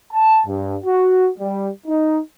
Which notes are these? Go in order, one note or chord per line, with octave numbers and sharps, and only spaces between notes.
A5
G2
F#4
G3
D#4